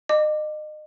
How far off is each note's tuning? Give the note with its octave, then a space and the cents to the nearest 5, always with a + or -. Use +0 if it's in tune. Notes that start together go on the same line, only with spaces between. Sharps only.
D#5 -30 D6 +0